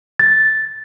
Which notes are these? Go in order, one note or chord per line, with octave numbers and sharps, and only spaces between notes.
A6